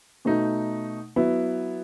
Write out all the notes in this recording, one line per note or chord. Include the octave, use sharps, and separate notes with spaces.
B2 A3 D#4
F#3 B3 E4